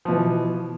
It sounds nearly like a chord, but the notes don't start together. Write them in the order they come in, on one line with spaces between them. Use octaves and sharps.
F3 B2 E3